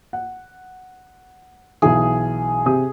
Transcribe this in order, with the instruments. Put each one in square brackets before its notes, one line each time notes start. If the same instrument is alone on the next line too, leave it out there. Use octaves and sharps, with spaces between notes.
[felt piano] F#5
[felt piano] B1 E3 [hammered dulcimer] G#4
[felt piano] C3 G4 D#6